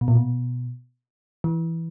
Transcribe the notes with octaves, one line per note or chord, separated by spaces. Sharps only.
B2
A#2
B2
E3